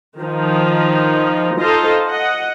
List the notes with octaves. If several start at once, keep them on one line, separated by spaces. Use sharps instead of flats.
D#3 F3 D#4
D#4 F4 A4 C5 D#5
D#5 F#5